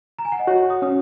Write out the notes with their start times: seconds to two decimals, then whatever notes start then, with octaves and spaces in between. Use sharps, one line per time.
0.19 A#5
0.25 G#5
0.32 F#5
0.39 D#5
0.47 F#4 C#5
0.70 D#6
0.82 C#4 D#6